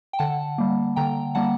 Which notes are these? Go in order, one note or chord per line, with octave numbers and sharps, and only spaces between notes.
G5
D3 F#5 A5
G3 A#3
D3 G5 A#5
G3 A#3 F#5 A5